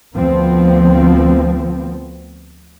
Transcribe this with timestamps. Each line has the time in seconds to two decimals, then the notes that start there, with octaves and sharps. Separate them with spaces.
0.16 D2 F3 B3 C4